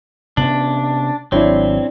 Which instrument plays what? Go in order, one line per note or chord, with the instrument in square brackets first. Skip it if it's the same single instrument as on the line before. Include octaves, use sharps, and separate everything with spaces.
[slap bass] C3 B3 C#4 [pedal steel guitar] D4 [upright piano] F#7
[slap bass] G#1 F#3 [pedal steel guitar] C4 [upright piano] D4 E4 C#5